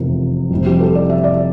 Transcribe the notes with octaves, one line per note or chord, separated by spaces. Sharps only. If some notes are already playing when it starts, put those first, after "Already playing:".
Already playing: F1 E2 C3 F3 A#4
F1 F2 C3 E3 G3
G4
A4
D5
E5
D5